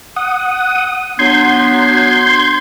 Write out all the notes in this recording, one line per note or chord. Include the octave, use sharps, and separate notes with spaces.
F#5 D#6
F#3 B3 D4 C6 G6 G#6